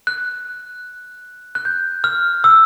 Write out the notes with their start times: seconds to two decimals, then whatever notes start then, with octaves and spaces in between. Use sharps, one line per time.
0.07 F#6
1.55 F#6
1.65 G6
2.04 F6
2.44 E6